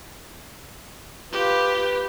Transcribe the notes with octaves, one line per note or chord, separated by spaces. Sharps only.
F4 G4 B4
B4